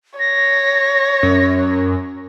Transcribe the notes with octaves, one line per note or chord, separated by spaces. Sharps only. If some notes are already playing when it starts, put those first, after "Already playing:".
C#5 A#6
F#2